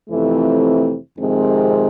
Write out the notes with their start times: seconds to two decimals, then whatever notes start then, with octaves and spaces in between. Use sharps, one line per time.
0.08 F2 C3 E3 A3 C4
1.19 F2 C3 D#3 G#3 C4